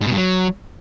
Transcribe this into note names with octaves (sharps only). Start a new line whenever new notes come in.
G#2
B2
G2
F#3